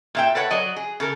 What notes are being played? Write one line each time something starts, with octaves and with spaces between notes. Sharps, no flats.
A#2 E5 G5
A4 B4 C#5 F#5
F#3 F#4 D5 D#5
G#4
C#3 A4 A#4